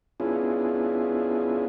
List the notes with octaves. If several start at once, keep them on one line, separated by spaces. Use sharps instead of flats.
B3 C#4 D4 E4 F4 G#4